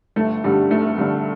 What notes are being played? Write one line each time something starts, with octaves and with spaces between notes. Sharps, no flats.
G1 A3
G2 D3 G3
G1 A3
G2 D3